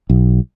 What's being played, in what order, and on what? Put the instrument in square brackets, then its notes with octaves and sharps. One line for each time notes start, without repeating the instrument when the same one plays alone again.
[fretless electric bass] B1